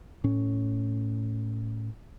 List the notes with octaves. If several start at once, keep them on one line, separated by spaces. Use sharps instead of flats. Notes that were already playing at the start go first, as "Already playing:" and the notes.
A2 C#4